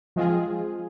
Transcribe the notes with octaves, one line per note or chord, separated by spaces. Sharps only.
F3 G#3 C4 F4 G#4